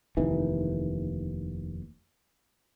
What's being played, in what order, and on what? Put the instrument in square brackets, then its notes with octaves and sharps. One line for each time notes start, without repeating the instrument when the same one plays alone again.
[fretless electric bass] F1 D#2 E3